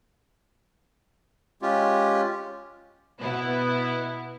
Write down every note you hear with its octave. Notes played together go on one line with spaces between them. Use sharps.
G#3 C#4 F4 G4
B2 B3 E4